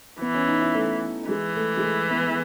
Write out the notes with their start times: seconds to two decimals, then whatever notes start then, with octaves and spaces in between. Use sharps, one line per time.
0.21 E3 B3
0.34 C#4
0.48 D#4
0.61 E4
0.75 A3
1.29 E3 G#3
1.56 A3
1.77 G#3
1.83 A3
2.10 B3